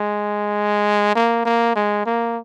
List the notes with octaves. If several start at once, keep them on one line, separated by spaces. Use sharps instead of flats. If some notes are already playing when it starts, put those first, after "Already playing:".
Already playing: G#3
A#3
A#3
G#3
A#3